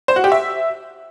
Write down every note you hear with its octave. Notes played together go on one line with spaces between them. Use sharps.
C5
F#4
G4
E5